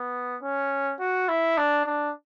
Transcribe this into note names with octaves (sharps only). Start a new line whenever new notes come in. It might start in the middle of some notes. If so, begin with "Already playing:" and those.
Already playing: B3
C#4
F#4
E4
D4
D4